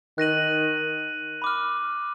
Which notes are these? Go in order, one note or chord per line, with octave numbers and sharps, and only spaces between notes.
D#3 F#6 A#6 D#7 F#7
B5 D6 F6